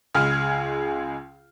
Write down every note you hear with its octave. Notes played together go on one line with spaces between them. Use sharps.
C#2 G#3 G#4 F6